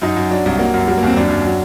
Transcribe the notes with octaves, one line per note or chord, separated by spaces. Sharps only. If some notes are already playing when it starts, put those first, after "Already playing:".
F#2 D#4
F#2
F#3 D4
C2
F#3 A#3
F#2
F#3 G3
A#3
D#2 C4
F#2 D4
F#2
F#3